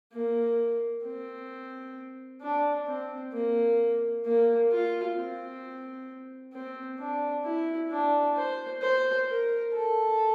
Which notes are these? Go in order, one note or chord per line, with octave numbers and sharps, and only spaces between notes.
A#3
C4
D4
C4
A#3
A#3
F4
C4
C4
D4
E4
D4
C5
C5
A#4
A4